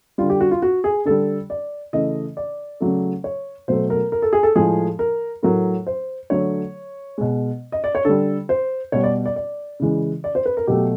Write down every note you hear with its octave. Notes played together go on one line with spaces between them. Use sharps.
D3 G3 F4
G4
F#4
F4
F#4
G#4
D3 G3 A4
D5
C#3 E3 A3 D#5
D5
C#3 F#3 A3
C#5
B2 F#3 A3 C5
A#4
A#4
A4
G#4
A4
A2 F3 G#3 G#4
A#4
A2 F#3 A3 A#4
C5
D3 F#3 A3 C#5
B2 G#3
D#5
D5
C#5
D3 G3 A4
C5
B2 G3 C#5
D5
D5
D5
C#3 E3 G#3
D5
C5
B4
A#4
B2 F#3 A3 G4